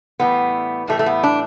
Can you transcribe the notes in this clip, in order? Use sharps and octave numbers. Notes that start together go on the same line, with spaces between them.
A2 E3 G3 B3
A2 E3 G3 A3
A3
B3
D4